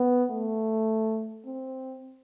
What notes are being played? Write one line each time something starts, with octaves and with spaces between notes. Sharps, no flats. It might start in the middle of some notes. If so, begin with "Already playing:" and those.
Already playing: B3
A3
C4